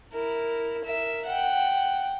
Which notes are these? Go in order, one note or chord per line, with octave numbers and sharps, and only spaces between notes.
E4 A#4
A#4 E5
F#5 G5